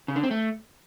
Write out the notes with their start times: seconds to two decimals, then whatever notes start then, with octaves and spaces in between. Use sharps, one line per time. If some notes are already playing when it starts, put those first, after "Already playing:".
0.08 C#3
0.16 D3
0.23 C4
0.31 A3